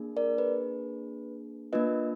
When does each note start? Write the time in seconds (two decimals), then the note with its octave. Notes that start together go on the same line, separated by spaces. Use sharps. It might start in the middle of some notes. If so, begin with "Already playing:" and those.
Already playing: A#3 D4 G#4
0.17 A#4 D5
0.38 B4
1.73 A#3 D4 F4 B4 D#5